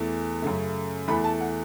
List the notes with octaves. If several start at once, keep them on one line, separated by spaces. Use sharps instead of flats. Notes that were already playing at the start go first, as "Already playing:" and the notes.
Already playing: E2 E3 A3
F#2 C#3 A3
E2 E3 A3 B5
A5
F#5